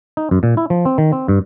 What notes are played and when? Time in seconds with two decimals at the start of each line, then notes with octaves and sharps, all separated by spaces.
0.17 D#4
0.31 F#2
0.43 A#2
0.57 E4
0.70 F3
0.85 C4
0.98 D#3
1.12 C4
1.28 G2